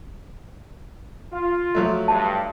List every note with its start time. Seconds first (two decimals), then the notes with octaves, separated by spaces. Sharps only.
1.32 F4
1.75 F3 F#3 A3
2.08 G2 A5